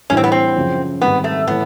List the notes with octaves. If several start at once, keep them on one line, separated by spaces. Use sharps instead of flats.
A2 E3 G3 C#4
C4
B3
C4
F#2 C#3 F3
G#2 D#3 G3 B3 C4 D#4
A3
A2 E3 A3 B3